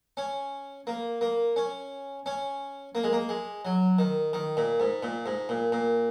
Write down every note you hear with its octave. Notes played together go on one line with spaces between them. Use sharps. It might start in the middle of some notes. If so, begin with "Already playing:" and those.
C#4
A#3
A#3
C#4
C#4
A#3
G#3
A#3
G#3
F#3
D#3
D#3
A#2
G#2
A#2
G#2
A#2
A#2